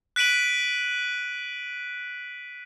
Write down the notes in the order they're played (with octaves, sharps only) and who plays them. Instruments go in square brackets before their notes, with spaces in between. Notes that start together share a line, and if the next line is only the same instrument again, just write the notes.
[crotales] F#6 B6 D7 D#7 F#7